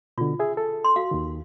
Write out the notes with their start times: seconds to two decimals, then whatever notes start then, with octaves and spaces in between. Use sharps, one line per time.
0.18 B2 D3 F4
0.39 G#4 E5
0.57 A4
0.84 C6
0.96 F#4 F5
1.11 D#2 D#3